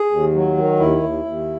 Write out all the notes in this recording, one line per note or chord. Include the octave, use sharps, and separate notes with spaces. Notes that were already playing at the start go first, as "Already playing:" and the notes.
Already playing: G#4
D#2
F#3
D#3
D#2 E4
D#2
D#2